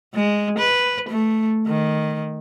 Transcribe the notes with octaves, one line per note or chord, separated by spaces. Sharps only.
G#3
B4
A3
D#3